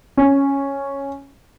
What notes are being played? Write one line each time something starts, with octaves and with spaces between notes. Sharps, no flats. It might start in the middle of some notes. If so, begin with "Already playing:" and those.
C#4